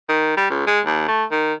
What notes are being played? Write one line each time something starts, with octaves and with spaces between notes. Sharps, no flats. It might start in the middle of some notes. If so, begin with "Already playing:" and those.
D#3
G3
C#2
G#3
D#2
A3
D#3